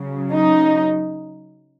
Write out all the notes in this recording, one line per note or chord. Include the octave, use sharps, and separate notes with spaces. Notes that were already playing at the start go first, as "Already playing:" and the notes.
Already playing: C#3 F#3
D#4